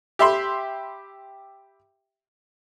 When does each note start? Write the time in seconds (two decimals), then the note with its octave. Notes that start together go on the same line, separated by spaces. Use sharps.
0.19 G4 E5 B5 C6